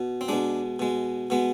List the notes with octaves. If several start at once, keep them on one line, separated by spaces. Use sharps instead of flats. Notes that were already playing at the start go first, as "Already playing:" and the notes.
Already playing: B2
C4
B2 G#3 D4
B2 G#3
B2 G#3 B3